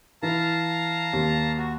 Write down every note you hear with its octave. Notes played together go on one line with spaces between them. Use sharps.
E3 E4 F5 A5 A#5
D#2
F#4